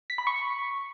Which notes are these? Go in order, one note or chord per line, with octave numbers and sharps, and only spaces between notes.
B6
B5
C#6